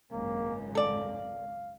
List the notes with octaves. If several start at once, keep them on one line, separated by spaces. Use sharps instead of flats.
G#1 C#2 F#2 A#3
A4 D5 F5